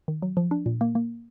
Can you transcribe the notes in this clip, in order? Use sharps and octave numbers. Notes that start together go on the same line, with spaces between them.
D#3
F#3
F3
D4
A#2
A#3
A#3